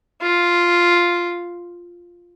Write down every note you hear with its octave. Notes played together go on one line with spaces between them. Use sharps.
F4